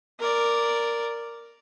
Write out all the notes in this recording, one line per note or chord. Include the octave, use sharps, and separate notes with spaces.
A#4 D5